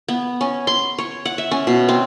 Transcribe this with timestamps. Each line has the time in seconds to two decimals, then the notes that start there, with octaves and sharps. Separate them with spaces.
0.08 B3
0.41 C#4
0.67 C6
0.98 C#5
1.25 F#5
1.38 E5
1.51 C#4
1.67 B2
1.89 C4